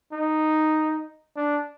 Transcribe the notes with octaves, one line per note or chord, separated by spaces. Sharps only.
D#4
D4